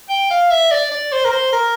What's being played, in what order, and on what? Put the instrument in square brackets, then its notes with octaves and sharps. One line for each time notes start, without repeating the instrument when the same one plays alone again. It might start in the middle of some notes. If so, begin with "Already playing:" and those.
[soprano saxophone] G5
F5
E5
D5
D5
C5
A#4
C5
A#4